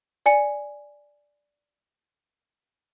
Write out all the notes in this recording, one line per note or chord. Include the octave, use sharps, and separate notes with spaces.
D5 G#5 C#7